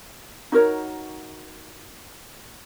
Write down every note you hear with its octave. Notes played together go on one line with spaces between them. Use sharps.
D#4 F#4 A#4 C#5